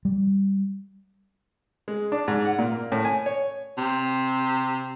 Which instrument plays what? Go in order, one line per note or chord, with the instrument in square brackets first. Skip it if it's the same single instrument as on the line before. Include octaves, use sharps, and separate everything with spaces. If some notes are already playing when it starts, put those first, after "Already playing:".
[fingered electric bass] G3
[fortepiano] G#3
D4
G#2
F#5
A#2
A#3
A2
G#5
C#5
[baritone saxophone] C3